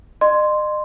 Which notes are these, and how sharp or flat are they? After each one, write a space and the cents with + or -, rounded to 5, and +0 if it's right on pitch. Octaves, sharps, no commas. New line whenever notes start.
D#5 -40 C6 +0